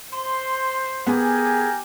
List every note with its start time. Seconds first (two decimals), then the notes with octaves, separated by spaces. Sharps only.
0.12 C5 C6
1.07 B3 G4 G#4 A#4 G#5